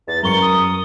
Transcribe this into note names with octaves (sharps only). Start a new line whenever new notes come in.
E2 A6
F#2 A#4 C#6 C#7 G7
D#6